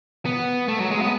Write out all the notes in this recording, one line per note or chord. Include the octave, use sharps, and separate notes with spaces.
B3
A3
F#3
G#3
B3